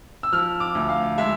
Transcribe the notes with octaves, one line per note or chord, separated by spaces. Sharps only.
E6
F3 F6
D6
D2
F5
G#3 E5